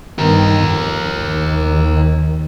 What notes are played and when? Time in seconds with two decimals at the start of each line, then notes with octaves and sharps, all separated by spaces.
0.19 G2 D#3 B3 G4 A#4
0.63 F2
1.24 D#2 D#3